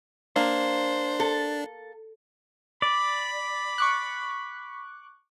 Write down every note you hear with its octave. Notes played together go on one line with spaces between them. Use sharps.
A#3 D4 C5
A4
D5 B5
C#6 D6 F#6